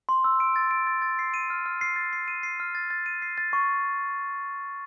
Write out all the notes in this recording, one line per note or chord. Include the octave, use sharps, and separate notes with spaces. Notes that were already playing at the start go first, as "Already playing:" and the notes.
C6
E6
D7
A6
D7
A6
A6
C7
D#7
F6
F6
C7
A6
C7
D#7
C7
F6
A6
A6
D#7
C7
A6
C#6